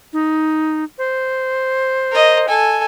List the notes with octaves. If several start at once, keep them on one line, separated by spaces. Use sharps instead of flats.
D#4
C5
A#4 D#5
A4 G#5